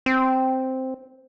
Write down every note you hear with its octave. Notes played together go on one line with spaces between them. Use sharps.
C4